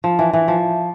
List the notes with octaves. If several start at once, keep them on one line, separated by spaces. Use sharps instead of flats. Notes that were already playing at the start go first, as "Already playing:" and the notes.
F3
E3
E3
F3